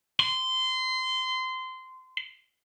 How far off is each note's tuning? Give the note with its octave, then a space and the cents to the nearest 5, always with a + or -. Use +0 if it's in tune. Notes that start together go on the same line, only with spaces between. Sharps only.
C6 -20